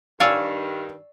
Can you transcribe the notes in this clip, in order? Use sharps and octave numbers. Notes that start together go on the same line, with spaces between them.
G2 D#3 C#5 D5 F5 G#5 E6